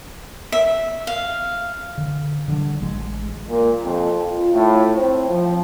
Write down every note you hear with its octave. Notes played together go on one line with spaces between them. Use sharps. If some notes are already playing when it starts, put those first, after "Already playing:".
E5
F5
D3
D3 F#3 G3 D4
A1 G#3
A#2
F2
F4
A2
C4
F3